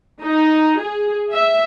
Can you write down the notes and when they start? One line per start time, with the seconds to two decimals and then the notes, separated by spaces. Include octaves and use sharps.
0.21 D#4
0.80 G#4
1.33 E5